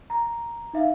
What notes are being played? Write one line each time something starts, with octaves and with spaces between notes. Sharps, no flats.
A#5
D#4 E5 F5